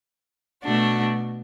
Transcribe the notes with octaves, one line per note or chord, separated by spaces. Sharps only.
B2 A3 D4 F#4